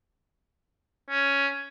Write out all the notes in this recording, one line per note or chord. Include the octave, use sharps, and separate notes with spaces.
C#4